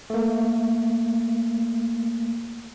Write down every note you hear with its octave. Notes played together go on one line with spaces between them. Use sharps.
A3 A#3